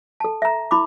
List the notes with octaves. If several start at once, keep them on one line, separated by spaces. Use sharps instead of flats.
A4 A5
E5 A#5
E4 B5 D6